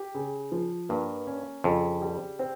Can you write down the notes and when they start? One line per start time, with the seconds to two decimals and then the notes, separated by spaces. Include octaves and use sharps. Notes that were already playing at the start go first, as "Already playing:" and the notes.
Already playing: G4
0.15 C#3
0.52 F3
0.89 G2 A#3
1.27 C#4
1.64 F2 C#3
2.02 G3
2.39 C4